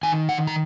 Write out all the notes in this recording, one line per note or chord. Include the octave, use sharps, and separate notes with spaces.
D#3 G#5
F#5
A#5